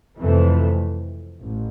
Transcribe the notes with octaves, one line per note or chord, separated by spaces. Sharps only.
F2 C3 E3 A3
A1